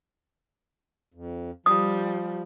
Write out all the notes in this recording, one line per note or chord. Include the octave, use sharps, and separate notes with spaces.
F2
F3 G3 D#6